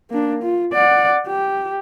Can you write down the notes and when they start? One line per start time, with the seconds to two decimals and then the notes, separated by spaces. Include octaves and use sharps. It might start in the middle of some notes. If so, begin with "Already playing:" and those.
0.10 A#3 D4
0.43 F4
0.73 D5 F#5
1.27 G4